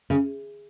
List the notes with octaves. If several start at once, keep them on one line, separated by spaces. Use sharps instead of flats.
C#3